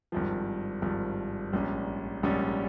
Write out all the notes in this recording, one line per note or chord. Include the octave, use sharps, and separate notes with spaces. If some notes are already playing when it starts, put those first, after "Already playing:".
G#1 G2 F3
G#1 G2 F3
A#1 G#2 G3 C#4
A#1 G#2 G3 C#4